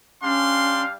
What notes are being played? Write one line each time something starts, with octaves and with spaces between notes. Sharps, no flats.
G3 C#4 D4 F5 C6